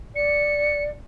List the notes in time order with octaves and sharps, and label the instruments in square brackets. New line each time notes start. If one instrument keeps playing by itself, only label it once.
[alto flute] D5 [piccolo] C#7